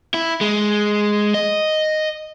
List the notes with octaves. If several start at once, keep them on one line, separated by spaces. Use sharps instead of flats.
E4
G#3
D#5